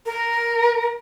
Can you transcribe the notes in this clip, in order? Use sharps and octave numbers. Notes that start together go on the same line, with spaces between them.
A#4